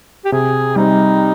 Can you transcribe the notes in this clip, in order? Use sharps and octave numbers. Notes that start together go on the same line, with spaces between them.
G4
C3 G#4
G3 C4 D#4